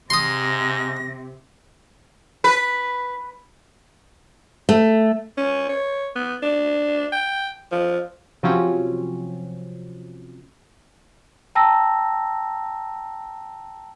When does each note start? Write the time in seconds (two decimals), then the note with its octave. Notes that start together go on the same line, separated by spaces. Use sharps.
0.10 G#2 C3 C6 D#6 A#6
2.44 B4
4.69 A3
5.38 C#4
5.69 C#5
6.16 B3
6.42 D4
7.13 G5
7.72 F3
8.43 C3 F3 F#3 C4 C#4
11.55 G5 A5 A#5 E6 A#6